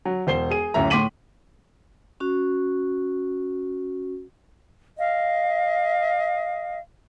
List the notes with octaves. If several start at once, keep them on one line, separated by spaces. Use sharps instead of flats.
F#3
E1 C5 C7 G7
G#4 D#7
D1 F#2 E5 A#5
A2 C6 D6 B6 D#7 F#7
C#4 F#4
D#5 F5